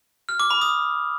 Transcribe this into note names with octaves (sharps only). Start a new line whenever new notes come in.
F6
D6
B5
D#6